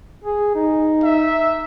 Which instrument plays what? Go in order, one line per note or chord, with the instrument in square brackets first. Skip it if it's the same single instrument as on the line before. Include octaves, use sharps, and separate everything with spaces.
[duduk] G#4
D#4
[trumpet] E5